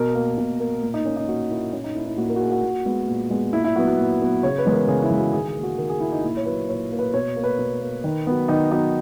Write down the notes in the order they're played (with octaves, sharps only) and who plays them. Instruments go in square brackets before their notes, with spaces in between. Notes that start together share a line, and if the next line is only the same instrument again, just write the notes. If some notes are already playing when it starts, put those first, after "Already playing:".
Already playing: [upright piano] B2 A#4
A#3
B2
A#3
A#2
D#4
A#3 C#4
D#4
A#2 F#4
A#3 E4
A#2 C#4
D#4
A#3 E4
E4
A#2 F#4
A#4
F#4
A#3 G#4
F#4
A#2
G#3 B3
A#2
G#3 B3
A#2 E4
E4
F#3 B3 F#4
F#4
A#2
F#3 B3
C#3 C#5
B4
E3 G#3 B3
A#4
C#3 G#4
E4
E3 G#3 B3
F#4
D#3 G#4
G#4
A#3
F#4
D#3 A#4
G#4
A#3 E4
D#4
A#2 E4
C#5
F#3 A#3 B4
A#2 C#5
F#3 A#3
B4
B2 C#5
A#3
B4
B2
A#3
D#3
F#3 B3
D#3 D#4
F#3 B3 D#4